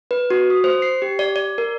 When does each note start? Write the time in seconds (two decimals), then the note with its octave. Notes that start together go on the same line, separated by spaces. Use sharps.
0.11 B4
0.30 F#4
0.50 D#6
0.64 C5
0.82 C7
1.02 G4
1.19 D5
1.36 D5
1.58 A#4